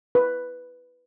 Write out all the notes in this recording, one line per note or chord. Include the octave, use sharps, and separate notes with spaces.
B4